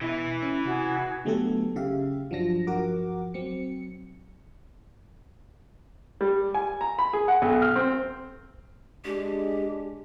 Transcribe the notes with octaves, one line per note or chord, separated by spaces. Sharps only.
B2 E3 E4
C#4
C3 F#4 G#4
D3 F#3 A3 B3 G4 A4
C#3 G4 E5 F5
G1 F3 F#3 D4 A#6
G1 F3 F#4 A#4 F#5 D6
F#3 C4 C#7
G3
G#5
A#5
B5
G#4
F#5
B1
F6
C4
G#3 D4 G4